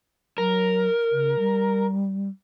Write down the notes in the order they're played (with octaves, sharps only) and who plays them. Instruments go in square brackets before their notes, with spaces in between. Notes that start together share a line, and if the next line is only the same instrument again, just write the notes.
[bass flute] F#3 [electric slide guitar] A#4
[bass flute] C#3
G3